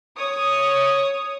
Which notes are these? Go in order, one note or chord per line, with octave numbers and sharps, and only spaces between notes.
C#5 D#6